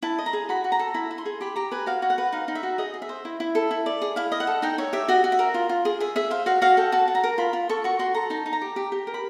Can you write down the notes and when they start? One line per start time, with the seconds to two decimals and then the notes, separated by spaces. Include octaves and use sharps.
0.03 E4 A5
0.18 D#5
0.26 A#5
0.33 G#4
0.49 F#4 B5
0.64 F#4
0.72 A#5
0.79 A4
0.94 E4 B5
1.11 E4
1.18 C6
1.26 G#4
1.41 G4 B5
1.56 G4 A#5
1.72 B4 G#5
1.86 F#4 F5
2.02 F#4
2.10 F#5
2.18 B4
2.32 D#4 F5
2.48 D#4
2.55 E5
2.63 F#4
2.78 G#4 D#5
2.94 G#4
3.02 E5
3.09 C5
3.25 E4
3.40 E4
3.55 A4
3.71 E4
3.86 D5
4.02 G#4
4.16 E4 F5
4.32 D#5
4.40 F#5
4.47 A4
4.62 D#4 G5
4.78 C#5 E5
4.93 G4 E5
5.08 F#4 D#5
5.24 F#4
5.32 E5
5.39 A#4
5.54 F4
5.69 F4
5.85 G#4
6.00 G#4 E5
6.16 G#4 E5
6.31 C5 F5
6.46 F#4 F5
6.62 F#4 F5
6.77 A4 G5
6.92 F#4 A5
7.08 F#4
7.15 A#5
7.24 A#4
7.38 F4 B5
7.53 F4
7.69 A4 C#6
7.84 F#4 C#6
7.99 F#4 C6
8.15 A4 A#5
8.30 D#4 A5
8.46 D#4
8.53 A#5
8.62 G4
8.76 G4
8.92 G4
9.07 A#4
9.14 B5